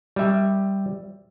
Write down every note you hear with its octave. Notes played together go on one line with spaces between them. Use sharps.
G3 E5